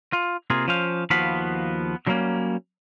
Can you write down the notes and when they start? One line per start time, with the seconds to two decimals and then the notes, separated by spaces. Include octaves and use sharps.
0.13 F4
0.50 C3 A#3 F4 G#4
0.68 F3 C#4 C5 F5
1.10 D#2 F3 B3 F#4 F5 B5
2.07 D3 F#3 G3 A3 A#3 C#4